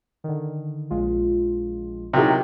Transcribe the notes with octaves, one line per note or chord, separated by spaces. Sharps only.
D3 D#3
A#1 G#3 F4
C3 D#3 F#3 E4 G4 G#4